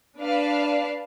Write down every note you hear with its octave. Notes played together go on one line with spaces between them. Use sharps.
D4 B4 D5 F5 A5